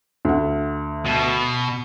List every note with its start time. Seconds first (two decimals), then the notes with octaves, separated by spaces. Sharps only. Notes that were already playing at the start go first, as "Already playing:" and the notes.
0.25 D2 F#5
1.05 B2